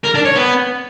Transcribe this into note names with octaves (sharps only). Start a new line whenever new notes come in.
A#4
D4
C#5
B3